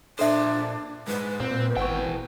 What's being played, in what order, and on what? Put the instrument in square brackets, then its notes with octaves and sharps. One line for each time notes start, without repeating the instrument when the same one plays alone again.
[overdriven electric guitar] A#2 C5 [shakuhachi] D4 [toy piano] A4 E5
[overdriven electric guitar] G#2 G#3 [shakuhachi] B4
[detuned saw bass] A#2 [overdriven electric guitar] C4
[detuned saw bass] G#1 [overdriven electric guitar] E2 G5 [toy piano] F#5 C#6